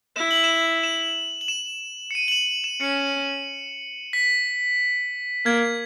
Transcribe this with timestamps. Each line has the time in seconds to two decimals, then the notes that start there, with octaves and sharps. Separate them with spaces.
0.16 E4 E7
0.31 F#7
0.44 E7
0.83 E7
1.41 F#7
1.48 E7
2.11 C#7
2.15 D#7
2.28 F#7
2.32 E7
2.48 F#7
2.64 E7
2.81 C#4 C#7
4.13 B6
5.45 A#3 G#6